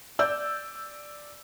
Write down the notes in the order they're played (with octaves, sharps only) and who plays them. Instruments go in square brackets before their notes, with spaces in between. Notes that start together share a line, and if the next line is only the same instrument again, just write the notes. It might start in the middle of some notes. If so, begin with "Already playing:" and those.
[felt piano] D5 E6 G6